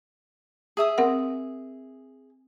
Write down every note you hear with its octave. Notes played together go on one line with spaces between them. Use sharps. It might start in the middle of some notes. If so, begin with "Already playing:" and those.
G#4 E5 D#6
C4 A#4 F#5